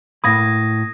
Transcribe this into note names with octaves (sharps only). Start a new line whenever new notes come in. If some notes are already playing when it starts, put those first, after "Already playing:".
A2 A#3 B5 D#6 G#6 A#6